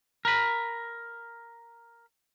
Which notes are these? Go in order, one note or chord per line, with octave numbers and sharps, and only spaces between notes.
A#4 B5